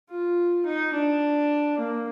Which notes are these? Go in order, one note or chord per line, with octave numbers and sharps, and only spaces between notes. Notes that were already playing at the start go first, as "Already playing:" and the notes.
F4
D#4
D4
A#3